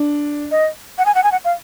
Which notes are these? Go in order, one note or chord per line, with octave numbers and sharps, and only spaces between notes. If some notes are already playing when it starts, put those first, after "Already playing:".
Already playing: D4
D#5
F#5
G#5
F#5
G#5
F#5
F5